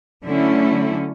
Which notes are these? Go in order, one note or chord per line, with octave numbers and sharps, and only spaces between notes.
D3 F#3 A3 C#4 E4